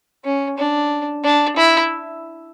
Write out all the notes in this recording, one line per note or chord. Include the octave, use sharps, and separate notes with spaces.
C#4
D4
D4
E4